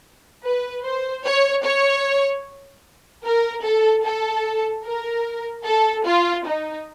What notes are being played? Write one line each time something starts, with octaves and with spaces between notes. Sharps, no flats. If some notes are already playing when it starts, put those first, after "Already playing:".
B4
C5
C#5
C#5
A#4
A4
A4
A#4
A4
F4
D#4